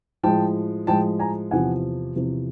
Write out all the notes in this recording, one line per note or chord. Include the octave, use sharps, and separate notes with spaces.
A2 F3 G#3 G5 A5
A2 F3 G#3 G5 A5
G#5 A#5
E2 C3 F3 F#5 G#5
E2 C3 F3